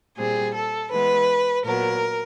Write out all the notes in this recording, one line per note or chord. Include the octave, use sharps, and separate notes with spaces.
A#2 G3 C4 G#4
A4
E3 G#3 B3 B4
A#2 F#3 B3 A#4